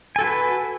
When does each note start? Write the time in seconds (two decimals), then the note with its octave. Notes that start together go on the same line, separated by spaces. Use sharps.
0.16 G#5
0.19 A4
0.21 F#4
0.24 B4